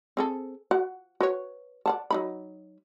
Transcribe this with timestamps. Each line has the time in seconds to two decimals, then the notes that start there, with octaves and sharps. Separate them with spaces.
0.17 C4 G#4 A4
0.71 F#4 F#5
1.21 F#4 B4 C#5
1.86 D5 F#5 A5
2.11 F#3 D#4 B5